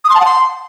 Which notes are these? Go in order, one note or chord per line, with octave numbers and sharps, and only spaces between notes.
D#6
C6
A5
F#5
C6